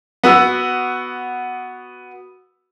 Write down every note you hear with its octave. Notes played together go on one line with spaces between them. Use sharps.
B3 F#4 E6